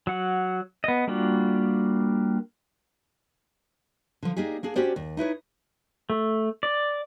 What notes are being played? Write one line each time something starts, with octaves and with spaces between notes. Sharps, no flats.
F#3 F#5
B3 D#5
G3 A#3 D4 F4 F#4
D3 F3
A#3 D4 D#4 G4 G#4
A#3 D4 G#4
C#4 D4 F#4 G4 C5 D5
D#2
D#4 E4 B4 C#5
A3
D5